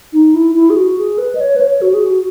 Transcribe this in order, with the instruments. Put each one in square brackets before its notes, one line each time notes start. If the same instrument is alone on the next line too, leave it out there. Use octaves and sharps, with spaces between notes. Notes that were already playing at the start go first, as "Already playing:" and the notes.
[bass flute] D#4
E4
E4
G#4
F#4
G#4
B4
D#5
C#5
B4
C#5
F#4
G#4
F#4